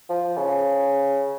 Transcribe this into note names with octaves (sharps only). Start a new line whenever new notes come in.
F3
C#3